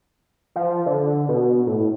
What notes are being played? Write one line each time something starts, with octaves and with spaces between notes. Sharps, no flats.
F3
D3
B2
A2